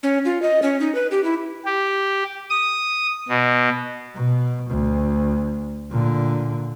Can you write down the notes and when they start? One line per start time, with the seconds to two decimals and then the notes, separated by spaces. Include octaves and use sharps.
0.03 C#4
0.25 F4
0.42 D#5
0.62 C#4
0.80 D#4
0.95 B4
1.11 G4
1.24 E4
1.65 G4
2.50 D#6
3.29 B2
4.15 B2
4.71 D2
5.91 A#2 D3